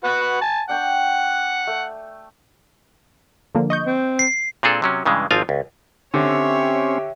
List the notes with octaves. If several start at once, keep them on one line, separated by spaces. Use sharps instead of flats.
F#4 B4 F#5
G#5 A5
D4 F#5 G5 C#6
A3
D3 F3 A#3
D#5 C#6 G6
C4
C7
A#2 C4 D4 G#4 A4
C3 F#3 C#4
G2 C#3 E3 G#3
G#1 F3 C4 F4 F5 G#5
C#2
D3 C4 C#4 G4 C#5 E5